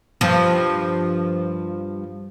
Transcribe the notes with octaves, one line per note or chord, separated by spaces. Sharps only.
G2 F3